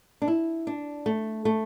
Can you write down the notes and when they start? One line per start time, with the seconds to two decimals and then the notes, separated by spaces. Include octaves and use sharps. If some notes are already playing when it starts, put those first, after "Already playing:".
0.22 D4
0.28 E4
0.67 D4
1.06 A3
1.45 A3